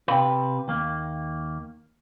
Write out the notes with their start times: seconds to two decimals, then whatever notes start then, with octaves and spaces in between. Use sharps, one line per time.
0.08 C3 B4 F5 G5
0.68 D#2 A#3